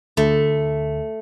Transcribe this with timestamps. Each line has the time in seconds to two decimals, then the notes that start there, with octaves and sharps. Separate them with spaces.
0.17 D2 A3